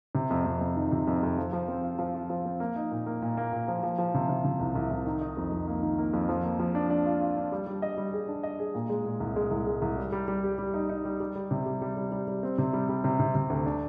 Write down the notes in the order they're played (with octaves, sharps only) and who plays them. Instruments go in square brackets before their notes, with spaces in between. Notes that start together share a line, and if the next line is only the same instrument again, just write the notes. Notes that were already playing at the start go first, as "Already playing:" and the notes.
[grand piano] C3
F2
F2
F2
D#3
C3
F2
F2
F3
F3
C4
F4
F3
F4
F3
C4
A#3
D#4
A#2
A#3
A#2
A#3
A#2
F3
F3
F3
C3
C3
C3
C2
C2
C2
D#3
D#4
F2
F2
A#3
D#3
A#3
F2
F3
A#3
F3
D4
D4
F4
F4
D4
G3
G3
D#5
G3
G#4
D4
D#5
G#4
A#2
G#3
A#2
C2
G#3
C2
G#3
C2
G3
G3
G3
G4
G3
D#4
D#4
G3
G3
G3
C3
G3
G3
G3
G3
G3
C4
C3
G3
G3
C3
C3
C3
D2
D4